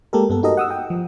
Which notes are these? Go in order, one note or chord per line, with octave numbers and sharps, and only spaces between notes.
G#3 A#3 G4 A4 A#4
G2 B3 A4
D#4 F#4 G4 A4 A#4 D#5
F#5 D#6 E6
G5
F3